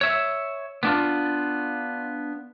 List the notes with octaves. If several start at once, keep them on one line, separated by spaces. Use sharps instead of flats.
C#5 E5
B3 D4 F4